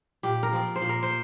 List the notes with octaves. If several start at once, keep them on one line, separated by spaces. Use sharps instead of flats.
A#2 G4
A#4
F3 C4
C5
A#2
A#4
C5